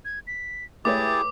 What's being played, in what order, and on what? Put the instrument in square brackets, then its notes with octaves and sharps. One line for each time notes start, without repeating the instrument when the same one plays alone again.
[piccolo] G#6
B6
[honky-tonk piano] A3 B4 C#5 [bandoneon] E4 G4 G#4 [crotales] D6 [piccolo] A6